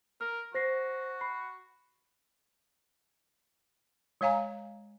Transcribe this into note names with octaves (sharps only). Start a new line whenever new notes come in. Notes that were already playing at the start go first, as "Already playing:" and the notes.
A#4 F6
F#4 C5 A#6 C7
B5 C7
G#3 C#5 F5 G#5 A#5